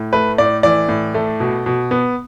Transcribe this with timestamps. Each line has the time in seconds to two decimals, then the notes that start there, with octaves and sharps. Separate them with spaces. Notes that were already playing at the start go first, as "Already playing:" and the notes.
Already playing: A2
0.13 A3 B4
0.38 A2 D5
0.63 E3 D5
0.89 A2
1.15 A3
1.40 B2
1.66 B2
1.91 B3